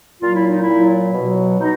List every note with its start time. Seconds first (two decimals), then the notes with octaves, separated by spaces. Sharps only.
0.21 A#2 F#3 F4
0.33 E4
0.47 D#4
0.59 E4
0.67 A#2 F#3
1.14 B2 F#3
1.60 B2 D#4